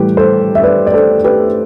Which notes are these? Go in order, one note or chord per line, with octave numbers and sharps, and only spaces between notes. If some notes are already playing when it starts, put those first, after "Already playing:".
Already playing: A2 E3 G3 G4 B4
A4 C5
E5
B4 D5
D5
A4 C5
G4 B4